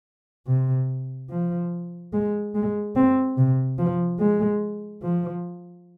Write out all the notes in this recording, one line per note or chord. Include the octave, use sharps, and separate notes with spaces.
C3
F3
G#3
G#3
C4
C3
F3
G#3
F3